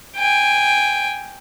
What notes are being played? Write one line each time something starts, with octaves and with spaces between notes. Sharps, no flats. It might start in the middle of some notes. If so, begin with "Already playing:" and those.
G5 G#5